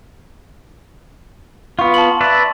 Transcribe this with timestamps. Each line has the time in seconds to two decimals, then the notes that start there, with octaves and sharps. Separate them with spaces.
1.79 B3 F4 C#6
1.94 A5 C6 F#7
2.21 B4 D5 E5